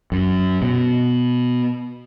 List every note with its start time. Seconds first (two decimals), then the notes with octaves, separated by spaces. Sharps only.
0.12 F#2
0.62 B2